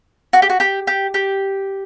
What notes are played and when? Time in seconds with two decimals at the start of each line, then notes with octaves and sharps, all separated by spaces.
0.33 F#4
0.42 G4
0.50 F#4
0.60 G4
0.87 G4
1.14 G4